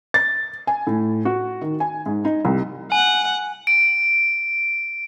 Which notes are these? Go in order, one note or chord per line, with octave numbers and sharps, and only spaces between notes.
A6
G#5
A2
F#4
D#3
G#5
G#2
D#4
C2
F#5 G#5
D7